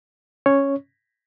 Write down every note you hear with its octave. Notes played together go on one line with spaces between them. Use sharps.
C#4 C#5